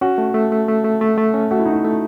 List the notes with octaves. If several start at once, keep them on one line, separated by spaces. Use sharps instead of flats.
C#4 F#4
A3
A3
A3
A3
A3
A3
A3
C#4
A3 F#4
E4
D#4 F#4
E4
A3